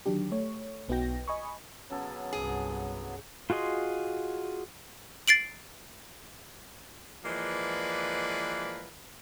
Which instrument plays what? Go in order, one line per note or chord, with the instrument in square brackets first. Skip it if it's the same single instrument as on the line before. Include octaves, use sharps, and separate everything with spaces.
[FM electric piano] D3 D#3 F#3 D4 G4
A3 C#5
B1 B3 D#4 F#4 G5 A#6
D#5 G#5 B5 C#6
[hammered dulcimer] C#3 A4 A#5 [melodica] F#3 B3
[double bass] C2 G2 [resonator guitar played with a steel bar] G#4
[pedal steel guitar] F4 F#4 G#4 D#5 C6
[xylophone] A6 C7 D7 F#7
[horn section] E3 F3 G#3 A#3 B4 D5